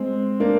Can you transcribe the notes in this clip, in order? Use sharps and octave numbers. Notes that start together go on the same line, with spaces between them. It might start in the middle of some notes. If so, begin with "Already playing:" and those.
Already playing: G#3 C4
A#3 D4